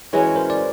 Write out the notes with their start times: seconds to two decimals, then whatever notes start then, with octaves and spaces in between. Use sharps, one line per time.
0.13 E3 G#3 C#4 F#4 B4 C#5
0.36 A#4 C5
0.50 D5